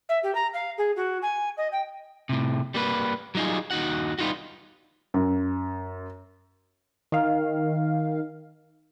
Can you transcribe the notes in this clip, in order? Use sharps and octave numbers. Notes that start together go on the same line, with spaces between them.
E5
G4
A#5
F5
G#4
F#4
G#5
D#5
G5
A2 C3
G3 A#3 B4
F#3 G3 D#4 F4 G#4
D#2 D#4 F#4 F#5
G3 B3 D#4 F4 F#4
F#2
D#3 F5